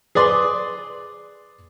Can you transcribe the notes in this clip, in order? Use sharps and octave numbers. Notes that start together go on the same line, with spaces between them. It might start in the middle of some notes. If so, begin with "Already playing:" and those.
G#4 B4 D5 C6